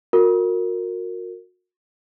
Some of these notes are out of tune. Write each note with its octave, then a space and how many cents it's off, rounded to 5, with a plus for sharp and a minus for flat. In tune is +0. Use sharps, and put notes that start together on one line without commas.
F#4 -35 A#4 -20